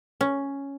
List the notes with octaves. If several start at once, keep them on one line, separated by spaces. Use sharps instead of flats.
C#4